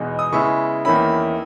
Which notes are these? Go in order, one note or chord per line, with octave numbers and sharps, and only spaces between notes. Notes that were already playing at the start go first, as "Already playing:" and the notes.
Already playing: E2 B2 G#3 D#4
D#6
C#3 G#3 B3 E4 C#6
E2 D#3 A#3 C#4 E4 B5